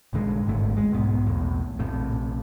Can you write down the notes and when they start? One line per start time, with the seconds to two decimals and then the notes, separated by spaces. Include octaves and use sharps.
0.13 A#1 G2 D3 G#3
0.46 D#1 G#1 G#2 A3
0.77 G#3
0.92 B1 G#2 B3
1.26 B1 E2 A2
1.79 A#1 A2 C3